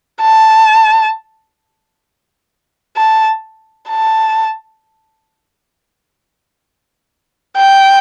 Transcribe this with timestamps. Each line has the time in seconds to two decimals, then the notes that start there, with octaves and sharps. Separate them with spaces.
0.22 A5
2.97 A5
3.89 A5
7.57 G5